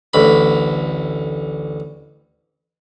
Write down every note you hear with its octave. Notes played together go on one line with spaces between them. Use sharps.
A1 D2 B5